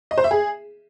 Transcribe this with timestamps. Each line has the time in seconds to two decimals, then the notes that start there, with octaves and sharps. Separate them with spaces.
0.11 D#5
0.18 C5
0.24 E5
0.31 G#4